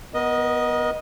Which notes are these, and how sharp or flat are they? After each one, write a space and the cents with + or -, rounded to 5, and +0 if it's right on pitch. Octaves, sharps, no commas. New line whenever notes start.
B3 +0 A#4 +40 D#5 +0